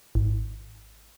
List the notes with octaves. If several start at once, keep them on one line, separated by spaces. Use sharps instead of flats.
G#1